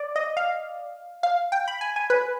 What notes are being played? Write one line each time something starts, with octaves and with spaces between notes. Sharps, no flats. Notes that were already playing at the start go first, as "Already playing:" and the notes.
Already playing: D5
D#5
F5
F5
G5
B5
G#5
G#5
B4